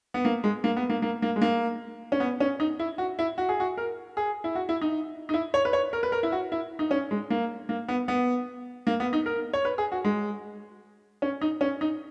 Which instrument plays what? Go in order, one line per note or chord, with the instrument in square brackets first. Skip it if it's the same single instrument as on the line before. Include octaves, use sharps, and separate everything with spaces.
[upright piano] B3
A#3
G#3
A#3
B3
A#3
A#3
A#3
G#3
A#3
C#4
B3
C#4
D#4
E4
F#4
E4
F#4
G#4
F#4
A#4
G#4
E4
F#4
E4
D#4
D#4
E4
C#5
B4
C#5
A#4
B4
A#4
E4
F#4
E4
D#4
C#4
G#3
A#3
A#3
B3
B3
A#3
B3
D#4
A#4
C#5
B4
G#4
F#4
G#3
C#4
D#4
C#4
D#4